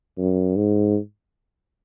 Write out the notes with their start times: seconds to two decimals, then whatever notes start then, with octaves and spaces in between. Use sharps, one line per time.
0.18 F#2
0.56 G#2